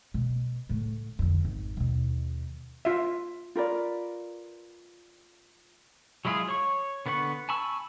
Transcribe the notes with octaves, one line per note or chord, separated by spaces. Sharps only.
B2
A2 C#3
F2 D3
G#1
D#2 B2
F4 E5
F4 A#4 B4 D5
F#3 G#3 E4 F4 G#4
C#5 C#6
D3 B3 B4 F#5 C#6
G#5 A5 B5 C#6 E6